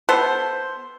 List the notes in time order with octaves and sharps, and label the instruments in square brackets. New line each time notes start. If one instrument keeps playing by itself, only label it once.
[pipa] B3 A4 C5